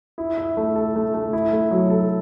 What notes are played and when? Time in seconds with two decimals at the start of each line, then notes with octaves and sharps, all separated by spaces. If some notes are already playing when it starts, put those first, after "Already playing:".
0.18 E4
0.38 E5
0.57 A3
0.76 A4
0.96 A3
1.14 A3
1.33 E4
1.53 A3
1.71 F#3
1.90 A4